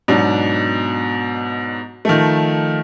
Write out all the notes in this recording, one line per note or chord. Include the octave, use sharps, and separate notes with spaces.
G#2 B2 F#3 B3 D4
D#3 F3 A3